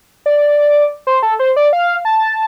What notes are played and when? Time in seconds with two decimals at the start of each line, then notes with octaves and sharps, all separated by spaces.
0.26 D5
1.07 C5
1.23 A4
1.39 C5
1.56 D5
1.73 F5
2.05 A5